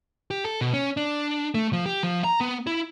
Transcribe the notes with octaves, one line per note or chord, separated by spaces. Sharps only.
G4
A4
B2
C#4
D4
A3
F3
G4
F3
A#5
B3
E4